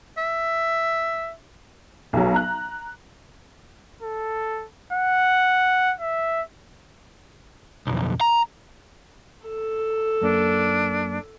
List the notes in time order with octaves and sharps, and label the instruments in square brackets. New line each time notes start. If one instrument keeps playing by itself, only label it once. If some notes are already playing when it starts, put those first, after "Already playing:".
[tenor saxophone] E5
[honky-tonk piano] B1 F#3
A#5 F#6
[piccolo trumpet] A4
F#5
E5
[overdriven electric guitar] B1 F2
A#5
[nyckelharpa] A4
[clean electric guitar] F#2 A#3 [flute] D4